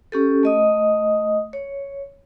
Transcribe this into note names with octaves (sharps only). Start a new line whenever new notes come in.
C#4 G4 A4
A3 D#5 D#6
C#5